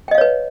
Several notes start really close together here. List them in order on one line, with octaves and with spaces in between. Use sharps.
G5 D#5 F5 C#5 B4